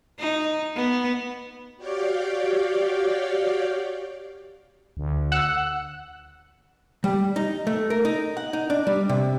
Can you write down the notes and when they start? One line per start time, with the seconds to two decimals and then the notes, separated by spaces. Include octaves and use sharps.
0.20 D#4
0.76 B3
1.77 F#4 G4 C#5 D5 F5 G5
4.97 D2
5.32 F#5 E6 F#6
7.04 G3
7.36 D#4
7.67 A3
7.90 A#4
8.05 D#4
8.37 F#5
8.53 D#4
8.70 D4
8.87 G3
9.09 C3